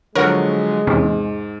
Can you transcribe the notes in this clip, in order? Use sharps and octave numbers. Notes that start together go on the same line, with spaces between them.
D3 F3 F#3 G#3 A#4 C#5 F#5
E2 G#2 C3 C#4